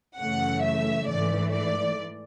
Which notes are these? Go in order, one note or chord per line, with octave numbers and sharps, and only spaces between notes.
F#2 C#3 E3 A3 F#5
E5
G#2 E3 A3 D5
D5